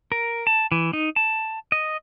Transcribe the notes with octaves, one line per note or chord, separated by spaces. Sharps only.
A#4
A5
E3
D#4
A5
D#5